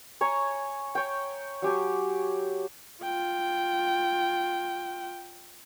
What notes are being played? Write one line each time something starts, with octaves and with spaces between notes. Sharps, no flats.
C#5 G#5 A#5 C#6
C#5 G5
F#3 G4 G#5
F4 G5